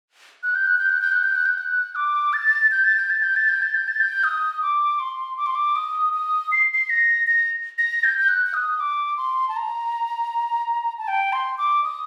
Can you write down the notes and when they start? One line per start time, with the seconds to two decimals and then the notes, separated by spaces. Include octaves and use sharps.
0.43 F#6
0.55 G6
0.67 F#6
0.78 G6
0.89 F#6
1.01 G6
1.12 F#6
1.24 G6
1.35 F#6
1.46 G6
1.58 F#6
1.96 D6
2.33 A6
2.71 G6
2.84 A6
2.97 G6
3.10 A6
3.23 G6
3.36 A6
3.49 G6
3.62 A6
3.75 G6
3.88 A6
4.01 G6
4.24 D#6
4.62 D6
5.00 C6
5.38 D6
5.46 C6
5.55 D6
5.76 D#6
6.13 D#6
6.52 C7
6.73 C7
6.90 A#6
7.27 A#6
7.78 A#6
8.04 G6
8.19 G6
8.29 F#6
8.46 F#6
8.54 D#6
8.80 D6
9.17 C6
9.48 A5
9.56 A#5
10.98 A5
11.08 G5
11.33 C6
11.58 D6
11.84 D#6